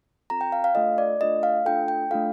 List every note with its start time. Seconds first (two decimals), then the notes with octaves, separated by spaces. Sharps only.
0.30 C4 F4 A4 A#5
0.41 G5
0.52 F5
0.64 F5
0.75 A3 D4 F4 A4 D#5
0.98 D5
1.21 A3 D4 F4 A4 D#5
1.43 F5
1.66 A3 D4 F4 A4 G5
1.88 G5
2.11 A3 D4 F4 A4 F5